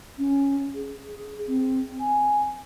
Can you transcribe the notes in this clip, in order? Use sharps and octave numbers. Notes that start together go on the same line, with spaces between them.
C#4
G#4
C4
G#5